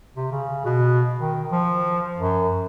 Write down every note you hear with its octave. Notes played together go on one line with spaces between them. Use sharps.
C3
C#3
B2
D#3
F3
F#2